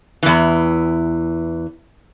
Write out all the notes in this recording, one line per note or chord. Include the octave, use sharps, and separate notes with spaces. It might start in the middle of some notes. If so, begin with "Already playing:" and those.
E2 E3